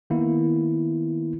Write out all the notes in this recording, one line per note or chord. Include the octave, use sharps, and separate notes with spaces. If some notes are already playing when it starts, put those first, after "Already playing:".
D#3 A#3 B3 E4